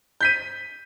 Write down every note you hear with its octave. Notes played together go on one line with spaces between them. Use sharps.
G6 B6 D#7